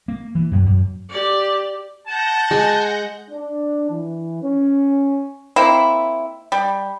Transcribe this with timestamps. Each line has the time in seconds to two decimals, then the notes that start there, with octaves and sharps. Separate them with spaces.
0.08 A#3
0.35 E3
0.51 F#2
0.66 F#2
1.10 G4 D5
2.06 F#5 A5 G6 A#6
2.51 G#3 G#5
3.30 D4
3.89 E3
4.42 C#4
5.56 A#3 C4 E4
6.52 G3